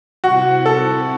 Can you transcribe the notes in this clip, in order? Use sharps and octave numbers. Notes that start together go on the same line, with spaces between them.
C3 G3 C4 E4 F#4
A4